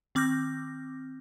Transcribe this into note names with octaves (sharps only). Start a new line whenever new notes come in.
D#3 C4 D6 F6 G6 A#6